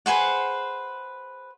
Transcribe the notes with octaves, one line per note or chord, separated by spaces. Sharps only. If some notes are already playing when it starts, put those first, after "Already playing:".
G#4 B4 C5 F#5